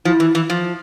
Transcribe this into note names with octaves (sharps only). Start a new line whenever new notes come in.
F3 E4
E3
E3
F3